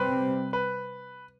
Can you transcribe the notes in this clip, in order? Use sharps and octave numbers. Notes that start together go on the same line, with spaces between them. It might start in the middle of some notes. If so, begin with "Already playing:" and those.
Already playing: C3 G3 C4 B4
B4